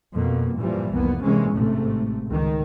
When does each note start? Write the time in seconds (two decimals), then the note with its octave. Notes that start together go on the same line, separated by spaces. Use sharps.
0.15 F2 B2 A#3
0.56 G2 A#2 E3 F3 G3
0.92 F1 C2 A#3 B3
1.22 C3 E3 G#3 A#3 C#4
1.55 A1 G#2 C3 A3
2.26 C#2 D#3